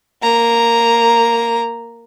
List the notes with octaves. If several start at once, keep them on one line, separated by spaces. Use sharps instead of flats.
A#3 A#5